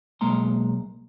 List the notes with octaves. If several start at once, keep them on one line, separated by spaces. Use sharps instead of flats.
B1 G#3 A#3 A#5 C6